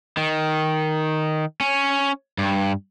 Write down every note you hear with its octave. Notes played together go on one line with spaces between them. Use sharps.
D#3
C#4
G2